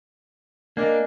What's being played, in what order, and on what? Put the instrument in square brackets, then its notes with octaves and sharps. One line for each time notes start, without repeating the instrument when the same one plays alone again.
[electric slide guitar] A#3 [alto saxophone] D4 [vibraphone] D#5 G#5